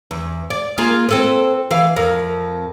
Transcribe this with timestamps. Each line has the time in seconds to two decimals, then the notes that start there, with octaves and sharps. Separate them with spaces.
0.11 E2
0.50 D5
0.78 A#3 F4 G#4
1.09 C4 A4 B4
1.71 E3 F5
1.96 F2 A#4